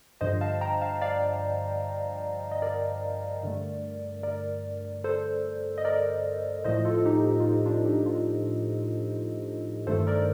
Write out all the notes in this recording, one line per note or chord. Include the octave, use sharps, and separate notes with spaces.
G2 D3 F3 C5 D#5
F5 A5
G5 A#5
F5 A5
D5 F5
D#5
A#4 D5
G2 D3 A3
A#4 D5
A4 C5
D#5
A#4 D5
A2 F3 A3 C5 D#5
F4 A4
A4
D#4 G4
D#4
F4
D#4
D4 F4
D#4 G4
D4 F4
G2 D#3 A3 A4 C5
A#4 D5